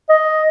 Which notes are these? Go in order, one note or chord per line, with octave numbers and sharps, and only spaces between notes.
D#5